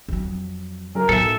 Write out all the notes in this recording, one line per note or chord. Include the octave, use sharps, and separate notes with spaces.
F2 F#3
F#2 A#4
B1 A2 A4 E5